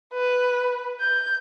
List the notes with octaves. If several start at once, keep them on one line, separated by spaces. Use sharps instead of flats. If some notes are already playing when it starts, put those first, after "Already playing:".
B4
G6